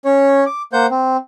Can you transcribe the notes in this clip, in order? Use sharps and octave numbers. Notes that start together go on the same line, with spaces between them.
C#4 C#5
D6
A#3 C5 F#5 G6
C4